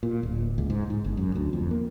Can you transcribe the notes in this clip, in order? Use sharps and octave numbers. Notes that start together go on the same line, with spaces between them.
A#2
D1
C#2
G#2
G#2
G1
F#2
D2
F2
A#3